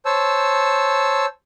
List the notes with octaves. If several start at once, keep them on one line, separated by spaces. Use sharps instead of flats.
C5 C#5 A5 E6